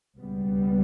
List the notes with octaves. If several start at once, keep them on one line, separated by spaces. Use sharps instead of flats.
C#2 B2 G3 B3